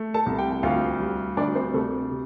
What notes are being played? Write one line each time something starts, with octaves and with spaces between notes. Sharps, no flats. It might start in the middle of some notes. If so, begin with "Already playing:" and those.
Already playing: A3
A4 A5
C2
G4 G5
G5
D2 F4 F5
G3
D2 D4 D5
C4 C5
C3 A3 A4
C3